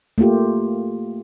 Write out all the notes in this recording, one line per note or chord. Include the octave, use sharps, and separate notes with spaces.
A3 A#3 F4 G4